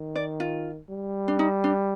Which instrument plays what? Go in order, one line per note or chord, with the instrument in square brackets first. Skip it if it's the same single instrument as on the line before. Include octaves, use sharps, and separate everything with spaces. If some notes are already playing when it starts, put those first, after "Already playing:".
Already playing: [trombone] D#3
[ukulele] D5
F4
[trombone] G3
[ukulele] D4
D#4
D4